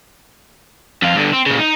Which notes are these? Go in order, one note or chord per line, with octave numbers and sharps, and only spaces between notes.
F2 F4
G2 D3
C4
A#2 C#3
D#4